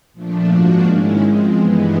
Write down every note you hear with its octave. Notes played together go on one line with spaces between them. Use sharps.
A#2 F3 A3 D4
G#2 F3 A#3 D4 F#4
D#3 G#3 C#4 E4
F3 G#3 C4
G2 E3 G#3 B3